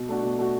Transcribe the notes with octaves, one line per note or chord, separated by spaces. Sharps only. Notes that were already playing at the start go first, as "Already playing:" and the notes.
Already playing: B2
A3 D4 F#4
B2
A3 D4 F#4